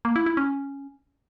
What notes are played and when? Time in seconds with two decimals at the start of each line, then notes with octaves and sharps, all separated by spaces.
0.05 A#3
0.16 E4
0.26 E4
0.37 C#4